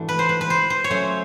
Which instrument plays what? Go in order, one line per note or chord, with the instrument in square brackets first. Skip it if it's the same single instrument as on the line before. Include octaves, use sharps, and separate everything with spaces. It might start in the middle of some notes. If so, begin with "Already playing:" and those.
Already playing: [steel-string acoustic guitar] G#2 E3 A3 D4 F#4
[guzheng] B4
C5
B4
B4
C5
C5
C#5
[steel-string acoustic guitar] A#2 F#3 A3 C#4 [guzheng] C5